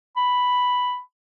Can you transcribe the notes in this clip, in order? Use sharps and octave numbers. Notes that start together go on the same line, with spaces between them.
B5